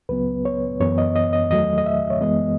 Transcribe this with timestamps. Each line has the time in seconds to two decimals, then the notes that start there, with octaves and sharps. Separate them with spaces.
0.09 C#2 C#3 F#3 B3 B4
0.45 C#5
0.80 F#2 E3 B3 C#5
0.98 D#5
1.16 D#5
1.33 D#5
1.50 E2 D#3 F#3 A3 D#5
1.78 D#5
1.86 E5
2.10 C#5
2.21 F#2 E3 G#3 B3 D#5